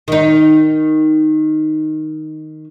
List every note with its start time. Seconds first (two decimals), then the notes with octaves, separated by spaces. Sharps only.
0.08 D#3 D#4